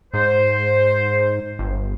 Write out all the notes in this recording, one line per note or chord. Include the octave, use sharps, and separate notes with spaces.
G#2 C5
G1